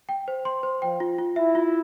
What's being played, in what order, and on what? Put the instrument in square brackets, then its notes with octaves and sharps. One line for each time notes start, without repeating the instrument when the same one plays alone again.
[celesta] G5
C5
C6
C5
[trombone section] F3 [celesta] G5
[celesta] F4
F4
[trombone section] E4 [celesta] E5
[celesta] F4